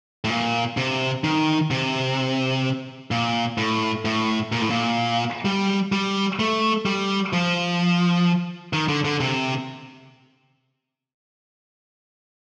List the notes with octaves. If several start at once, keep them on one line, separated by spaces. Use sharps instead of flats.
A2
A#2
C3
D#3
C3
A#2
A2
A2
A#2
A2
A#2
G3
G3
A3
G3
F3
D#3
D3
D3
C3